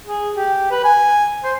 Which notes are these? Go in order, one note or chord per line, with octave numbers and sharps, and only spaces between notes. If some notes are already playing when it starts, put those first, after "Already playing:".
G#4
G4
B4
G#5
C5